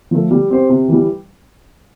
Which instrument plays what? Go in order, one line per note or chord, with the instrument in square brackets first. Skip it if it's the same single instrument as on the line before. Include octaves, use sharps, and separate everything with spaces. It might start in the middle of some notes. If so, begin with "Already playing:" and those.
[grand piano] F3 A3
G3
C4 G4 C5
C3
E3 G3